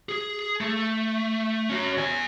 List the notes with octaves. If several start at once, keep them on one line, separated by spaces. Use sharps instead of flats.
G#4
A3
C#4 F#4
E2 G#5